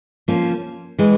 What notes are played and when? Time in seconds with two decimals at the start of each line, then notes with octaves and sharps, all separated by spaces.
0.28 F3 A#3 C#4 F4
0.98 E3 G#3